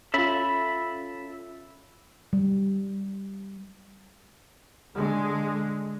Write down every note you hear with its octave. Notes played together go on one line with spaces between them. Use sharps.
C#4 F4 A4 E5 B5
G3
D3 G#3